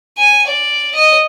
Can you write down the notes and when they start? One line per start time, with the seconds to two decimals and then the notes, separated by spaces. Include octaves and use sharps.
0.17 G#5
0.46 D5
0.95 D#5